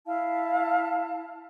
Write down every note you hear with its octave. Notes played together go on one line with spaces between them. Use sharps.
E4 F5 A5